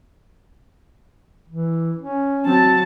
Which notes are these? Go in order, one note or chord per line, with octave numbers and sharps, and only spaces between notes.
E3
C#4
F#3 C4 A5